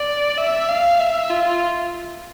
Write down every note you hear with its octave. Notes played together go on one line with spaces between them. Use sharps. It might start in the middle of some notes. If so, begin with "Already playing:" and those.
Already playing: D5
E5
F5
E5
F4